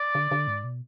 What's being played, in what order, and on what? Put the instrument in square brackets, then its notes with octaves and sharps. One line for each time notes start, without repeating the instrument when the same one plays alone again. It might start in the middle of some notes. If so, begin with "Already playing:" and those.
Already playing: [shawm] D5
[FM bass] D3
D3
G#2
B2